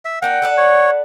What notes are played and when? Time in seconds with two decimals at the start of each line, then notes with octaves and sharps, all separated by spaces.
0.05 E5
0.22 A#3 D4 D#4 F#5 G5
0.42 A4 B4 D5
0.57 C#5